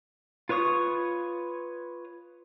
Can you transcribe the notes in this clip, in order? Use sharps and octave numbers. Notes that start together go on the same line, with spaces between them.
F4 B4 C#5 C#6 D#6